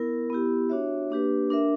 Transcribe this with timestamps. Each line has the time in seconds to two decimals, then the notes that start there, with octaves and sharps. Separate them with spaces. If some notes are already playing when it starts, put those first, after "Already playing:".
Already playing: B3 E4 A#4
0.30 B3 E4 G4
0.70 D4 F#4 C#5 E5
1.10 A#3 D4 G4 B4
1.50 D4 A#4 E5